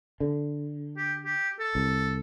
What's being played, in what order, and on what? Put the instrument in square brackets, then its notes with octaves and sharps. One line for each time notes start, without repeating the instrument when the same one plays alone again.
[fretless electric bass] D3
[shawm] G4
G4
A4
[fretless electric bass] C2